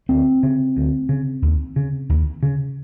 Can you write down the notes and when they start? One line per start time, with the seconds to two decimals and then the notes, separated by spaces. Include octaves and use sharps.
0.09 D2 C4
0.43 C#3
0.77 D2
1.09 C#3
1.42 D#2
1.76 C#3
2.09 D#2
2.43 C#3